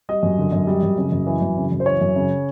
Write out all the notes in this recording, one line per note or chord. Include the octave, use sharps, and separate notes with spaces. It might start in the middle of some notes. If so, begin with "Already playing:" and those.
G3 D#5
F#2
D3
F#2
G3
F#2
C#3
F#2
E3
F#2
C#3
F#2
C5
E3 C#5
F#2
C#3